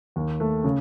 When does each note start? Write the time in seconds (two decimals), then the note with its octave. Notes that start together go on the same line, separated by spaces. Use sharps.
0.16 D#2
0.40 A3
0.64 C#3